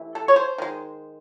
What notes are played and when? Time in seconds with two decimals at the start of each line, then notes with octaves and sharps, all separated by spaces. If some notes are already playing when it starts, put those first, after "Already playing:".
Already playing: C3 E3 A3
0.15 A4
0.28 C#5
0.36 C5
0.58 D#3 G#3